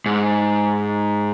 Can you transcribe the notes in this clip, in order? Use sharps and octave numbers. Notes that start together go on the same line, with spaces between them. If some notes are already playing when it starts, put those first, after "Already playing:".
G#2